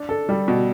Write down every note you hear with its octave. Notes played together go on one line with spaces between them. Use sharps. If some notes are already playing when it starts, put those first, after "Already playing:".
Already playing: D4
A4
G3
B2